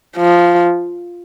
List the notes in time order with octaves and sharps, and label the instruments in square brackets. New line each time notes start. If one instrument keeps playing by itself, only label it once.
[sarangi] F3